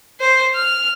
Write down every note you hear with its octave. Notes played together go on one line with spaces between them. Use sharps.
C5
F6